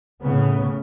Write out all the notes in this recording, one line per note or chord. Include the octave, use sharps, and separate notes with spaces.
A2 C#3 B3